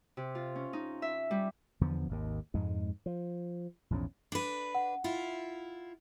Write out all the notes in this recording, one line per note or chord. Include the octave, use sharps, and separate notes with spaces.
C3
F4
C#4
D#4
E5
G3
E2 D3 F3 B3
G#1 D#2 D#3
F2 G#2 G#3
F3
A#1 E2 G#2 C#4
D4 B4
F#5
E4 F4